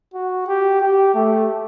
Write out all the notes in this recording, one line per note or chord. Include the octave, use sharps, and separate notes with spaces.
F#4
G4
G4
A3